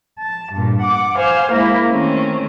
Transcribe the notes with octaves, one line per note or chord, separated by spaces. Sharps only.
A5
G2 A#2
F#5 D6
C5 F5 G#5
G#3 A#3 E4 A#4
D#3 A3 C4 C#4